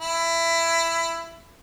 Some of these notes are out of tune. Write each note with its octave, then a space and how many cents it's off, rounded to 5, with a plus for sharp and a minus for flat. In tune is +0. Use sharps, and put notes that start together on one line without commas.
E4 +15